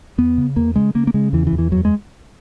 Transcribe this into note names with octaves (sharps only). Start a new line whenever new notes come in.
E2 B3
C#3
E2 A#3
C#3 G#3
C#3 A#3
A#3
C#3 G#3
E2 E3
E3
E2
E3
F#2 F#3
G#3